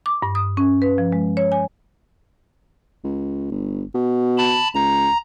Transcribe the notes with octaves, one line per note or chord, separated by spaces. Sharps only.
D6
G2
D#6
C#4
B4
F3
G#3
C#5
G#5
C#2
G1
B2
A5 B5
C#2 A#5